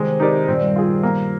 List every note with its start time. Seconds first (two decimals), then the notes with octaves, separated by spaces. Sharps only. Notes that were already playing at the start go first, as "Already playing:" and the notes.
Already playing: C3 D#3 G#3
0.20 D#4 G4 A#4 D5
0.47 G2 A#2 C4
0.76 F4 G#4
1.03 A#3